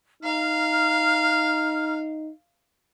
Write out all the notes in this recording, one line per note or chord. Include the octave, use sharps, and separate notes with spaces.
D#4 F5 A#5 F6